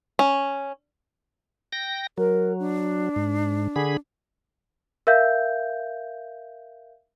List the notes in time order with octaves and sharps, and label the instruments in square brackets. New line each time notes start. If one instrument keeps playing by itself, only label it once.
[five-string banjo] C#4
[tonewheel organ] G5 A#6
[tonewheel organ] F#3 [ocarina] A#4
[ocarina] D4
[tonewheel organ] G#2
D3 G#4 B5
[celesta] A#4 E5 F5 G6